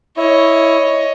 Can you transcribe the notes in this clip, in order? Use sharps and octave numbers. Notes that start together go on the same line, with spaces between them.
E4 C#5 D#5